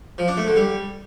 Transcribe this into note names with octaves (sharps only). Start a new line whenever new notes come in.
F3
D4
A3
D3
G3